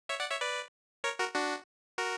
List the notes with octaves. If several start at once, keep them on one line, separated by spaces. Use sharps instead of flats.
C#5 E5
D5 F#5
C#5 E5
B4 D5
A#4 C#5
F#4 A#4
D4 F#4
F#4 A#4